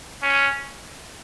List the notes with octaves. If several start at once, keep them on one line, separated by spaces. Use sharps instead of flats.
C#4